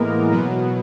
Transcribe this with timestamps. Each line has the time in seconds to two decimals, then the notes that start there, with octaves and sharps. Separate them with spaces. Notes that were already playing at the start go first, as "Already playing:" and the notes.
Already playing: A2 E3 G#3 A#3 B3 A#4
0.31 B2 F#3 B3